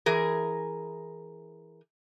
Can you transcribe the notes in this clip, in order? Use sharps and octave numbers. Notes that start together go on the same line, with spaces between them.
E3 G#4 A#4